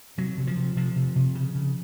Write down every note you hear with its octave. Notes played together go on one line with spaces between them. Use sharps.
C3 F#3
C3
F3
C3
C3 F3
C3
C3
C#3
C#3